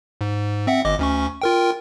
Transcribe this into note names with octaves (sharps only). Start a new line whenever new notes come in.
G#2
C4 E5 F#5
G1 D#5 D6
D2 C#4 C#6
F4 A#4 G5